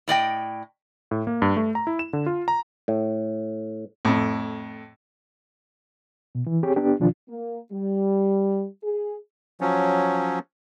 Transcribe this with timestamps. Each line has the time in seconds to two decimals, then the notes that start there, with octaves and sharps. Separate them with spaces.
0.08 A2 D5 D#5 G5
1.11 A2
1.27 A#3
1.42 G2
1.57 A3
1.75 A#5
1.87 E4
1.99 E7
2.13 D3
2.26 F4
2.48 A#5
2.88 A2
4.05 F2 A2
6.35 B2
6.47 E3
6.63 C4 G4 G#4 C#5
6.76 B3 D4 G4
7.00 B2 D#3 F3 D4 F4
7.28 A#3
7.72 G3
8.83 G#4
9.61 F3 F#3 C#4